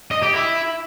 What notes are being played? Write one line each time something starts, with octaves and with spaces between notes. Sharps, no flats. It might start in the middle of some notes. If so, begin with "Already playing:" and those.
D#5
G4
E4